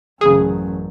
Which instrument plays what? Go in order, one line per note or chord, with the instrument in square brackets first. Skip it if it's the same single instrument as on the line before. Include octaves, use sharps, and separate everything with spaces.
[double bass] A1 F#2 [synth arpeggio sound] C#3 G#4